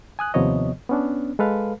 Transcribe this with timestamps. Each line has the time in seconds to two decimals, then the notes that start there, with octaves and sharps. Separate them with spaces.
0.19 G#5 D#6 F#6
0.34 D#2 C3 F3 B3 C#5 D#5
0.89 B3 C#4 D4
1.39 G#3 A4 B4 F5